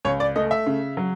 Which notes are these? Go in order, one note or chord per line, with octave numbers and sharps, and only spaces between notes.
C#2 C#5
D5
A3 D#5
E5
C#3
F#3